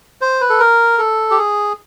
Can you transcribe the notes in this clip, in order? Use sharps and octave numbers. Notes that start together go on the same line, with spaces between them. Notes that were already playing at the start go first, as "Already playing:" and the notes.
C5
B4
A4
A#4
A4
G4
G#4